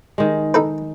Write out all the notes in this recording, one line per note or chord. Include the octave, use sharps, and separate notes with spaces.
D#3 G#3
D#4 A4 B4